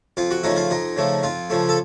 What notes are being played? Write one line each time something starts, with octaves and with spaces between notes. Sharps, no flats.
F2 F4
F#4
C#3 F3 A3 D#4
F4
F2 D#4
C#3 F3 A3
F2 F4
C#3 F3 A3
A4